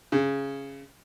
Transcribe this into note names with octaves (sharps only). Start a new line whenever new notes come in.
C#3